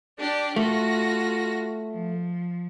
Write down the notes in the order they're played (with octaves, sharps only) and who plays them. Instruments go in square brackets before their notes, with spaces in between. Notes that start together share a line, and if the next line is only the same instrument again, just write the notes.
[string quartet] D4 G4 D5
[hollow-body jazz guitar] A3 [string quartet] F4 F#4 A#6
[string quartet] F3